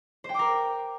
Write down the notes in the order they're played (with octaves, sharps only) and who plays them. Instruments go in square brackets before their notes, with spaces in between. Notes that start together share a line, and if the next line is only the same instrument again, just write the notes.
[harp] C5
G5
D6
A#4